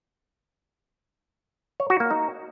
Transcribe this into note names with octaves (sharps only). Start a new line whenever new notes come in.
C#5
F#4
A#3
D#4